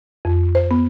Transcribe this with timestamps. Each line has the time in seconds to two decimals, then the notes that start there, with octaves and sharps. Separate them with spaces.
0.25 F2
0.55 C5
0.71 B3